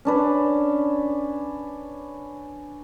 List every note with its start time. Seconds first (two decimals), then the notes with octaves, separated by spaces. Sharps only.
0.05 C#4 D4 B4